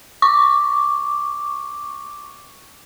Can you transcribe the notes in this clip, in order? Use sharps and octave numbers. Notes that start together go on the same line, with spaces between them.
C#6 D6